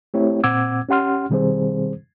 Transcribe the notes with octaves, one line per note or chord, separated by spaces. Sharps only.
A3 C4 E4 G4 C#5
A#2 C4 F#5 D6 E6 G#6
C#4 G4 F#5 C6 F6
B2 D#3 G3 C4 G#4 C5